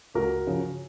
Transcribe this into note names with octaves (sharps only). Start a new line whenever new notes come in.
C#2 F#4 A#4
C#3 F3